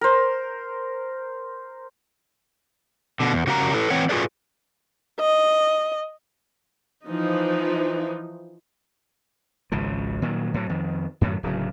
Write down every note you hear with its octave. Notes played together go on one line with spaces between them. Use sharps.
A#4 C5
B2 D3
E2
C#3 F#4 G4 A#4 D#5 A#5
E4 A4 B4
E3 C4 C#5 F#5
F4 F#4 G#4 A4 B4 D5
D#5
E3 F3 D#4
G#1 C#2 C#3 F3
A#2 D#3 F#3
A2 F#3
F2 D#3
F#2 A2 D#3 F#3
D1 C#3 F#3